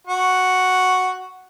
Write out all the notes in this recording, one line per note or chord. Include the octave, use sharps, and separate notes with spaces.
F#4